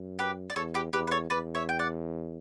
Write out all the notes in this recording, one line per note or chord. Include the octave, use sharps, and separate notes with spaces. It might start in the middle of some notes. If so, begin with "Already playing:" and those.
Already playing: F#2
G4 B4
D5
E2 A4 C#5
G4 B4
E2 G4 B4
B4
A4 C#5
E2 B4 D5
C#5 E5
G5
D5 F#5